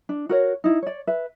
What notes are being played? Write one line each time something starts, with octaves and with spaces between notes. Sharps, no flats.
D4
F#4 A#4 C#5
D#4 E4
C#5 D5
B4 E5